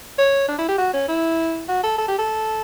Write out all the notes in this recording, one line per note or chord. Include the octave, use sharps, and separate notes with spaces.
C#5
D4
E4
G4
F#4
C#4
E4
F#4
A4
A4
G4
A4